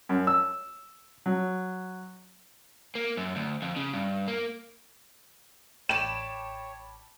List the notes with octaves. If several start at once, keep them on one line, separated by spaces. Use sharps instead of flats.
F#2
E6
F#3
A#3
F#2
D2
F2
C#3
G2
A#3
A1 C#5 D5 G5 A5 B5 E7